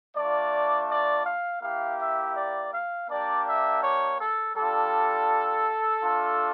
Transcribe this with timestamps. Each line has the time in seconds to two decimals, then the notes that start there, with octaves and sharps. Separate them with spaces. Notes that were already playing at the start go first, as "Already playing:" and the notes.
0.16 A3 D4 F4 D5
0.90 D5
1.26 F5
1.63 A#3 E4 G4 F5
2.00 E5
2.37 D5
2.73 F5
3.09 A#3 D4 G4 D5
3.47 E5
3.83 C#5
4.20 A4
4.56 G3 D4 F4 A4
6.04 A3 D4 F4